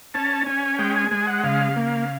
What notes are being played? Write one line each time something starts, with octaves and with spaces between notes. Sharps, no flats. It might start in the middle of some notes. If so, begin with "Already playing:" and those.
C#4 A5
C#4 G#5
G#3 G5
G#5
G#3 G#5
F#5
C#3 F5
A#3